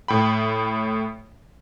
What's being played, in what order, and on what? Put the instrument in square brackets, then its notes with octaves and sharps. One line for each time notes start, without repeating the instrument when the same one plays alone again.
[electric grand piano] A2 G5 B5